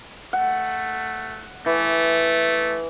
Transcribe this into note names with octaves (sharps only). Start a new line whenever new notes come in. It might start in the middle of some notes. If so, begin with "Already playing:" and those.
A3 F#5
E3 A3